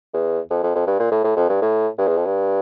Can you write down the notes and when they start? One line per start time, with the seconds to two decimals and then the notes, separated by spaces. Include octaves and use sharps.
0.14 E2
0.50 F2
0.63 F2
0.75 F2
0.87 G2
0.99 A#2
1.12 A2
1.24 A2
1.37 F2
1.49 G2
1.62 A2
1.98 G2
2.07 E2
2.17 F2
2.26 G2